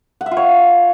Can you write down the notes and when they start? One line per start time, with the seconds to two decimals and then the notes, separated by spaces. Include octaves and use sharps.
0.21 F#5
0.26 E5
0.31 F4
0.37 C#5